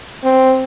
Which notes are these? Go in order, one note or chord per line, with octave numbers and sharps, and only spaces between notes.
C4